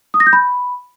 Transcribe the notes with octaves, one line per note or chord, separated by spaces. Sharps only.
D#6
A#6
G6
B5